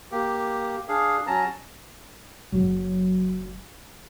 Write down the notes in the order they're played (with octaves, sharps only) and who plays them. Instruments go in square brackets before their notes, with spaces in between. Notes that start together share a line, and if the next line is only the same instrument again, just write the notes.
[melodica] A#3 G4
D4 G#4 F5
F#3 C#4 A5 A#5
[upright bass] F#1 F#3